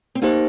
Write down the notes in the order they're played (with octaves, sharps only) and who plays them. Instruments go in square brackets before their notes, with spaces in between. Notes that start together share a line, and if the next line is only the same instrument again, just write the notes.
[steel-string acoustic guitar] C4
[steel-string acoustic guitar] A#3 [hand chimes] D#4 G4 C5